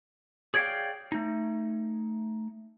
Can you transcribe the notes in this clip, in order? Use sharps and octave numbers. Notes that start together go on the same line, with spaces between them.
G#4 C#5 D5 E5 F5 G5
A3 D#4